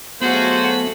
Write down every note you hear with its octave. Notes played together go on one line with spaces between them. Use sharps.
F#3 A3 B3 F4 F#4 G#4 C5